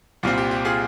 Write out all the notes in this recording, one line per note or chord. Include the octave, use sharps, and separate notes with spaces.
C2 A#2 G3 C4 F4
G4
G4
F4 G#4